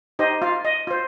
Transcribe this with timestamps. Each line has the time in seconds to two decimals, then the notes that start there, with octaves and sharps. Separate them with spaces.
0.19 D#4 G4 C5 D#5
0.42 F4 F5
0.65 D#5
0.87 F4 C5